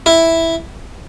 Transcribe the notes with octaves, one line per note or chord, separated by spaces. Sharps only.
E4